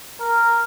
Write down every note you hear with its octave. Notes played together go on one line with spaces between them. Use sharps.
A#4